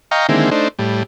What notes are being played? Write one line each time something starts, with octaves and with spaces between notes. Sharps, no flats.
D#5 F5 G5 A#5 C#6
D3 D#3 G#3 A#3 C4 E4
A3 D4 D#4 C5
A2 G3